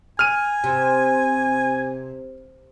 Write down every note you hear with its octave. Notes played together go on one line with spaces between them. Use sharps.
G#5 F6 D#7
C3